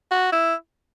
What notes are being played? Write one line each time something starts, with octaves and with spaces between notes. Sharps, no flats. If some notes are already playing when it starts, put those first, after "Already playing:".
F#4
E4